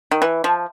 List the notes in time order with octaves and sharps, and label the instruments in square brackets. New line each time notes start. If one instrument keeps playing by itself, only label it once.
[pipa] D#3
E3
F3